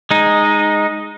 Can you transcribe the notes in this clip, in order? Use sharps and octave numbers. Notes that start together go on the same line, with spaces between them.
G#3 D#4